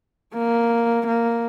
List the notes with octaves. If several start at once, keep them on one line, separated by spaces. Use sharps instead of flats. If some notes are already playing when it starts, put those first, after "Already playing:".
A#3
A#3